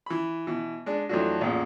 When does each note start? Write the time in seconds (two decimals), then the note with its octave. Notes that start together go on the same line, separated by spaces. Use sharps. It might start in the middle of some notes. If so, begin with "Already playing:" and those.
0.06 E3 B5
0.47 B2 E3
0.86 G#3 D4
1.09 F2 E3 F#3 A3 D4 F#4
1.41 A1 E2 A#2